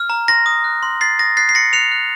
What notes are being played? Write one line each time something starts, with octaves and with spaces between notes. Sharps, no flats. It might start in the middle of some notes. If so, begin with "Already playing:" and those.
Already playing: F6
A#5
C6 A#6
D#6
F#6
C6
C6 A6 C7
D#6 A#6
F#6 A6 C7
C7
C6 A#6 C#7
F#6 C#7 F7
F#6